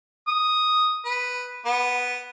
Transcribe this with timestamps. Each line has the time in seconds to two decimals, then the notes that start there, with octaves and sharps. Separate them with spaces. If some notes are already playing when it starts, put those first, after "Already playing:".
0.27 D#6
1.05 B4
1.65 B3